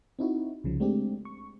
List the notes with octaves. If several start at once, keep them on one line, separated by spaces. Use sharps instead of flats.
C4 D#4 E4 F#4
C2 C#3 F3
G#3 A3 C4 D4 G4
C#6